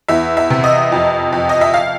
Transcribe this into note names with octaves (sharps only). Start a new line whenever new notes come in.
E2 E5
E5
C3
D#5
F2
F2
D#5
E5
F5